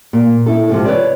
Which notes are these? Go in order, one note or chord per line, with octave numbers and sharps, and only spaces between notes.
A#2
E4 A4
G#2 C3 F3
B4 C#5 D5